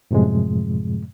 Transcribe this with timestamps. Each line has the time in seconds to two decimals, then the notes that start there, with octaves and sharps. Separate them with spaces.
0.11 F#2 A2 C3 F3 G#3